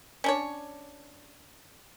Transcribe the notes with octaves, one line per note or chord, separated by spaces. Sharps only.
C#4 D4 C#5